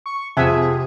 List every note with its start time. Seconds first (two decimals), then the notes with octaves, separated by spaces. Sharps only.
0.06 C#6
0.37 F2 C3 G#4 E5 F#5 G#5